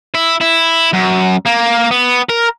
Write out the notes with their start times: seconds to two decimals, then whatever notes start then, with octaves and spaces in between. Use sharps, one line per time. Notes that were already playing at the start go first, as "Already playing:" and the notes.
0.15 E4
0.41 E4
0.93 F#2
1.46 A#3
1.91 B3
2.30 A#4